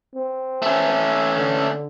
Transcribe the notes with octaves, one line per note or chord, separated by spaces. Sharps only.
C4
A3 C#4
D3